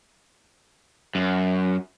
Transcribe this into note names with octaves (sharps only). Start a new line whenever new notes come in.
F#2